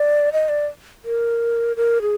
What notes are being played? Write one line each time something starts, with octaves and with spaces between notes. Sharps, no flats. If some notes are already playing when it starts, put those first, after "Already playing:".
Already playing: D5
D#5
D5
A#4
A#4
G#4